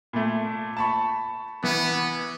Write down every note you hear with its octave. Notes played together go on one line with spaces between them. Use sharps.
A#2 A3
A5 B5 C#6
E3 B3